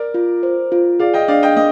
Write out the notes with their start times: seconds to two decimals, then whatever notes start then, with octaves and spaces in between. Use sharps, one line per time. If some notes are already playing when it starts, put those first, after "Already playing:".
Already playing: A#4 D5
0.14 F4
0.43 C5
0.72 F4
0.99 G#4 D5 F5
1.13 D#5 G5
1.28 D4 D5 F5
1.42 D#5 G5
1.56 A#3 D#5